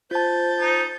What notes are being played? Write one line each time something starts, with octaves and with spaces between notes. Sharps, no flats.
F4 C5 A5 G6 A6
D#4